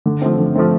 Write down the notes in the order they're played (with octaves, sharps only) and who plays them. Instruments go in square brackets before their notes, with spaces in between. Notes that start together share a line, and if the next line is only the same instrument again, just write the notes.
[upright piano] D3
F3 A3 C4
D3
F3 A3 C4